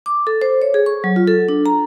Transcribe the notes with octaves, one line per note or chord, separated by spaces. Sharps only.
D6
A4
C5
C#5
G#4
C#6
F#3
F4
A4
D4
A#5